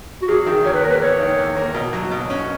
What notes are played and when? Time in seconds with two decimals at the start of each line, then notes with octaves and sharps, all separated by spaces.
0.22 F#4
0.28 E2 G#4
0.46 D#3
0.64 E2 C#5
0.73 B4
0.82 A#3 A#4
0.90 B4
1.01 E2 C#5
1.20 D#3
1.38 E2
1.57 A#3
1.74 B2
1.93 F#3
2.11 B2
2.30 C#4